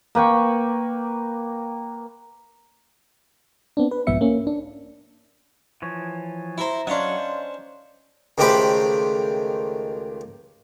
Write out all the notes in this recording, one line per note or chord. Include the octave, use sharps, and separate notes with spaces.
A#3 B4 G5 C#6
B3 C4 D4
B4
B1 G#2 F3 B3 E5 C#7
A#3 C#4
D4
E3 F3 C#5
E4 C5 E5 A#5
F#3 C#4 D4 C#5 D#5 F5 C6
C5
C#2 D#3 A3 G4 C5 B5